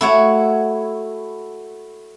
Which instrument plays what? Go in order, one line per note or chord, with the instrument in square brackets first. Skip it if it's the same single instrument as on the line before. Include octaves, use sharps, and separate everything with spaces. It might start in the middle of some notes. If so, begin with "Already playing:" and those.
[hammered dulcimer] A3 [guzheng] E4 F#4 C#5